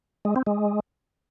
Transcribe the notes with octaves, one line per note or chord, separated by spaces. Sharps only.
G#3
C4
G#3